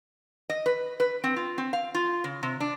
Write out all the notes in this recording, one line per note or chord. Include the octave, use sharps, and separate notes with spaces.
D#5
B4
B4
C4
F4
C4
F5
F4
C#3
C3
D4